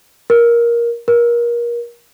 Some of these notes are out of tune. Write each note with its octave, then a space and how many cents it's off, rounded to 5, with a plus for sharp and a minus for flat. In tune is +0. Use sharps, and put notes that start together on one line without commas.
A#4 +15
A#4 +30